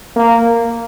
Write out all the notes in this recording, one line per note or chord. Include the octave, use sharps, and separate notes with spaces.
A#3